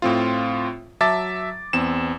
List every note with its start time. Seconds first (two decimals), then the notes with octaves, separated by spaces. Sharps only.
0.02 A2 C4 F4
1.01 F#3 E5 A5 D6 A6
1.73 E2 C4 E7